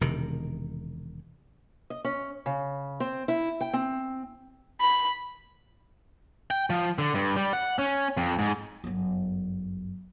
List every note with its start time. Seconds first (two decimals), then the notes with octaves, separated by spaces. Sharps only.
0.01 E1 C3 D#3
1.90 D#5
2.04 C#4
2.46 C#3
3.00 C4
3.28 E4
3.61 G5
3.73 C4
4.80 B5
6.51 G5
6.70 F3
6.99 D3
7.14 G2
7.36 G3
7.53 F#5
7.79 C#4
8.17 F2
8.39 G#2
8.84 G1 F#2